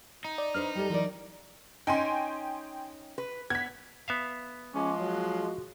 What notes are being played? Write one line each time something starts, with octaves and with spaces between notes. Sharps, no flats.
D#4
D5
D4 B4 C5 F6
G3 G4 A4
E3 F#3 A#4 D5
C#4 D#4 G5 G#5 C6
B4
B3 G#6 B6
B3 E5 F5
F3 G#3 C#4 D6
F#3 F#4